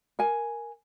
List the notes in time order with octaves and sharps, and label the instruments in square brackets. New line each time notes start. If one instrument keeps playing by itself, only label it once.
[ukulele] A#4 G#5